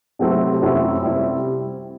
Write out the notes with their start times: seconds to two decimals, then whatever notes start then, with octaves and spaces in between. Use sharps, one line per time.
0.19 C3 F#3 A3 C4 E4
0.61 F#2 F#3 A3 C4 E4
1.03 C3 G3 C4 E4